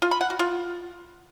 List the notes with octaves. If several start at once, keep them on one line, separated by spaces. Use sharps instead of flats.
F4
B5
F#5
F#4
F4